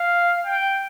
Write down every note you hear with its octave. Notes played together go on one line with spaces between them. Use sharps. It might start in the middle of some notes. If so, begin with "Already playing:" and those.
Already playing: F5
G5